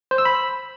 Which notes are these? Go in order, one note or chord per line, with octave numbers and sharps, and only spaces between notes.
C5
E6
B5